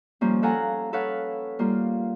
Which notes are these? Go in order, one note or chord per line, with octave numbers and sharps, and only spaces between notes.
F3 G3 A#3 C#4
A4 F5 F#5 G#5 A#5
A4 B4 C#5 F5 F#5
G3 A#3 F4